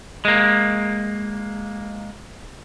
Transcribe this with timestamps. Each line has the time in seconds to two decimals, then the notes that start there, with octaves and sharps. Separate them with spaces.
0.25 G#3 A#3